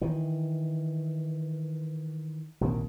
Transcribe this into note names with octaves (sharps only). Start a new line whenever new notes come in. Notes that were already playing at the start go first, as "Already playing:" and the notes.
D#3 E3
A#1 D#2 C3 A#3